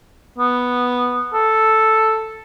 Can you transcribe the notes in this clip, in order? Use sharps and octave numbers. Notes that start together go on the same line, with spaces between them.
B3
A4